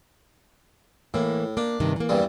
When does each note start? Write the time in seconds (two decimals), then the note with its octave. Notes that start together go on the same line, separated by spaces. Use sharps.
1.14 A2 E3 A#3
1.57 A#3 D4
1.80 G2 C3 D#3
1.96 E3 A#3
2.09 E2 G2 G3